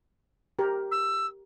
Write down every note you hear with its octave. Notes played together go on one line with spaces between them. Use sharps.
G4 A#4
E6